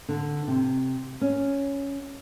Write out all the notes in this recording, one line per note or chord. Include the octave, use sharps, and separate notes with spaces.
D3
C3
C#4